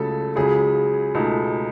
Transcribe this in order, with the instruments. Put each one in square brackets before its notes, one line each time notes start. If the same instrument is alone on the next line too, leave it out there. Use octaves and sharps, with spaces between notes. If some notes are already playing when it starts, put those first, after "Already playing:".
Already playing: [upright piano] C#2 C#3 F#3 A3 [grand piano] A4
[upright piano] C#2 C#3 F#3 [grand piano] G#4
[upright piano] C#2 B2 A3 D#4 A4